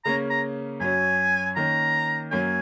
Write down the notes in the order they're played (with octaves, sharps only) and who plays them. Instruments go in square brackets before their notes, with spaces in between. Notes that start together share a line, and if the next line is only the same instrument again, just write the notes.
[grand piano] C#3 A#3 C#4 [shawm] A#5
[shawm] A#5
[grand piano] F#2 F#3 C#4 [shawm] G#5
[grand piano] D#3 A#3 C#4 [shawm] A#5
[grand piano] F#2 F#3 A#3 C#4 [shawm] G#5